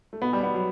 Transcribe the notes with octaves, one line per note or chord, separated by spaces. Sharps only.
A3
B2 B3
G3
B2
B3
F#3